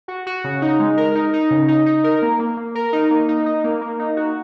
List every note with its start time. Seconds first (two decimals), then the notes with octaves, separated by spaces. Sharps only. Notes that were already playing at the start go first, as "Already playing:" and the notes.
0.08 F#4
0.27 F#4
0.44 C#3
0.62 D#4
0.79 G#3
0.97 A#4
1.15 D#4
1.33 D#4
1.51 C#3
1.68 D#4
1.86 D#4
2.04 A#4
2.22 A#3
2.39 A#3
2.57 A#3
2.75 A#4
2.93 D#4
3.10 A#3
3.28 D#4
3.46 D#4
3.64 A#3
3.81 A#3
3.99 D#4
4.17 F#4